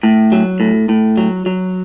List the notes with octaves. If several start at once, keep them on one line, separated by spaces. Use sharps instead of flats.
A2
F#3
A2
A2
F#3
F#3